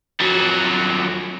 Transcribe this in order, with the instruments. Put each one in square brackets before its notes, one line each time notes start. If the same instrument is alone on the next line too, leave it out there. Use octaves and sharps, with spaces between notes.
[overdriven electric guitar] F2 F#3